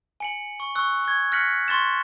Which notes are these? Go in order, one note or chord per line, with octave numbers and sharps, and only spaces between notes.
G#5 C#7 F#7
C#6
C#6 E6 F#6
C#6 G#6
F6 F#6 A#6 B6 C#7 F#7
C6 C#6 A6 E7